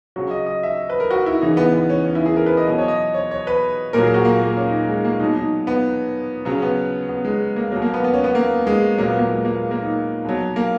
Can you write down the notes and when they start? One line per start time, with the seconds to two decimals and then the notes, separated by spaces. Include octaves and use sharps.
0.16 C#3 F#3 F#4
0.31 D#5
0.46 D#5
0.63 E5
0.90 B4
1.00 A#4
1.11 F#4
1.26 E4
1.41 C#3 E3 D#4
1.57 B3
1.74 B3
1.89 C#4
2.05 C#4
2.15 E4
2.26 G#4
2.36 A#4
2.46 B4
2.57 D#5
2.67 B2 F#3 D#5
2.78 C#5
2.88 D#5
3.14 C#5
3.31 C#5
3.47 B4
3.93 A#2 F#3 A#4
4.04 G#4
4.14 F#4
4.25 A#3
4.42 A#3
4.57 C#4
4.68 D#4
4.89 G#3
5.05 A#3
5.20 B2 F#3 D#4
5.36 D#4
5.67 B3
6.45 C#3 F#3 C#4
6.62 B3
7.09 B3
7.25 G#3
7.56 A#3
7.72 B2 F#3 A#3
7.82 A#3
7.94 B3
8.04 B3
8.13 C#4
8.24 B3
8.35 A#3
8.67 G#3
8.98 A#2 F#3 A#3
9.08 B3
9.19 A#3
9.29 G#3
9.45 A#3
9.71 A#3
9.82 D#4
10.25 B2 F#3
10.56 A#3